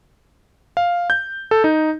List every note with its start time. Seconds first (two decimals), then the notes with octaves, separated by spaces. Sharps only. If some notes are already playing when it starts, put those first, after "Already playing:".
0.77 F5
1.10 G6
1.51 A4
1.64 D#4